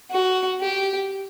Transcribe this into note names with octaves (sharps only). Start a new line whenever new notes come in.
F#4
G4